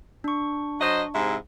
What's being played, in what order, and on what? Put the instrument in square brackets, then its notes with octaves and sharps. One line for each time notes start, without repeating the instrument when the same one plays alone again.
[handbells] D4 C#6
[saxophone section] F#3 C5 D#5
G#2 C3 E4